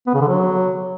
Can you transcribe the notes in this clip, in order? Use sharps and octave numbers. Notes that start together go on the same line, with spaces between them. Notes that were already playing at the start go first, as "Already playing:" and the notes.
B3
C#3
D3
F#3